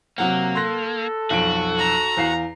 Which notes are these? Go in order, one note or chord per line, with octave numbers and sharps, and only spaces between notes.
C3 F#3 A#3 F#5
A4 C6 F#6 A#6
B1 F2 F#4 D7
A#5
E2 F5 C7